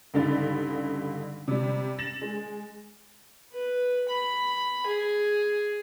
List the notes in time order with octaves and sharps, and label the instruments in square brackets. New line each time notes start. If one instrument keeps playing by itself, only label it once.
[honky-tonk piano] C#2 G2 D3 D#4 A6
C3 G3
A6 A#6 E7 F#7
G#3
[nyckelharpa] B4
B5
G#4